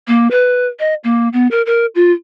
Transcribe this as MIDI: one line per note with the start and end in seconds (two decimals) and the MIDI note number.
0.08 0.28 58
0.31 0.66 71
0.79 0.94 75
1.04 1.29 58
1.33 1.47 59
1.51 1.62 70
1.66 1.86 70
1.95 2.11 65